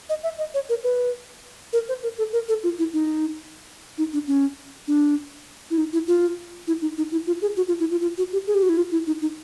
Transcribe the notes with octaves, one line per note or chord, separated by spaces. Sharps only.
D#5
E5
D#5
C#5
A#4
B4
A#4
C5
A#4
A4
A#4
A4
F4
E4
D#4
D#4
D4
C#4
D4
E4
D#4
E4
F4
E4
D#4
D#4
E4
F4
G#4
F#4
F4
E4
F4
F4
F#4
G4
G#4
G4
F#4
E4
F4
E4
D#4
D#4